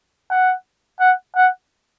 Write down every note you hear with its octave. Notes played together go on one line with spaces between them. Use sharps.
F#5
F#5
F#5